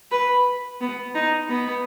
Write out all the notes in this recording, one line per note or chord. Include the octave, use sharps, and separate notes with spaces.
B4
B3
D#4
B3